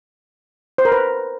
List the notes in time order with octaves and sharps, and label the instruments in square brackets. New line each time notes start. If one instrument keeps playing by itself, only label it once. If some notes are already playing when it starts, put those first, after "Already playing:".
[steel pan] C5
A#4
B4